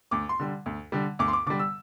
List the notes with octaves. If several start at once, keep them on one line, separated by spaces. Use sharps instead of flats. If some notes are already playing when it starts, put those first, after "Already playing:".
D2 D6
C6
D3 G3
D2
D3 G3
D2 D6
C6
D6
D3 G3 D6
E6